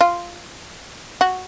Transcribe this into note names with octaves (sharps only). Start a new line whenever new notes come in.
F4
F#4